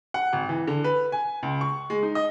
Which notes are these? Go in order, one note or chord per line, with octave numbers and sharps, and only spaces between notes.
F#5
G#1
E3
D3
B4
G#5
C#2
C#6
G#3
D#4
D#5